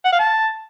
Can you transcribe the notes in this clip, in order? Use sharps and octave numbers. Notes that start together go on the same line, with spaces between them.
F#5
F5
A5